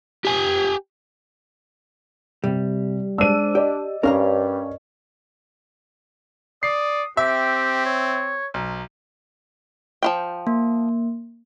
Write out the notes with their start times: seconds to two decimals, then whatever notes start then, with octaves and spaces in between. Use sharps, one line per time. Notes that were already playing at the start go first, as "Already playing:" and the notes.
0.25 G4 G#5
2.44 C3 G3
3.18 G#3 D4 C5 E6 D#7
3.55 G4 D5 D#5
4.03 G2 C#4 A#4 F5 A#5
6.63 D5 D#6 C7
7.17 C4 G4 E5
7.86 C#5
8.54 B1
10.03 F3 F4 G5
10.47 A#3